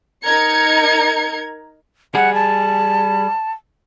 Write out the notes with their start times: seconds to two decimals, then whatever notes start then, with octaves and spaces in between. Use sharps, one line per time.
0.23 D#4 A#4 A#5 G#6 C#7
2.15 G3 G#4 F#5
2.35 A5